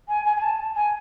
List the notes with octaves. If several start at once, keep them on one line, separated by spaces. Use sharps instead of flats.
G#5
G#5
G#5
A5
G#5